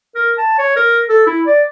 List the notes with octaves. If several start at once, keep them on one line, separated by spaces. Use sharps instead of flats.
A#4
A5
C#5
A#4
A4
E4
D5